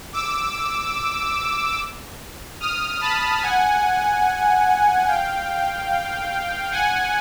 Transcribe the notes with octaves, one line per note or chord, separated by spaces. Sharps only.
D6 E6
D#6 F6
A5 B5
F#5 G#5
F5 G5
F#5 G#5